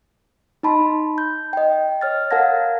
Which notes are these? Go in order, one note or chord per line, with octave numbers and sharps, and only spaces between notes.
D#4 D#5 A5 B5 C6
G6
D#5 G5
C#5 F6 A6
A#4 F5 F#5 A5 G#6 A#6